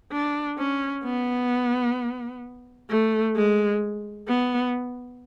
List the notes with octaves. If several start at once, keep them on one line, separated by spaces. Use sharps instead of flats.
D4
C#4
B3
A3
G#3
B3